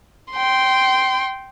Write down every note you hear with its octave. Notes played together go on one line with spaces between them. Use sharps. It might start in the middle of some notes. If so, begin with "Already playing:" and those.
G5 C6